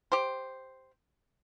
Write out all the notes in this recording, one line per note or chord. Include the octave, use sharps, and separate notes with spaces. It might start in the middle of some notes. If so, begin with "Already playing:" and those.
G4 C5